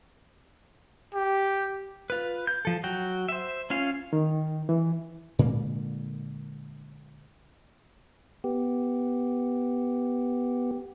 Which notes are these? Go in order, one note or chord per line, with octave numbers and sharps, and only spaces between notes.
G4
F4 B4
G6
F3 A4
F#3 F#4 G5
C5 E5
C#4 F4 F5
D#3
E3
A#2 D3 G#3 A#3
B3 G4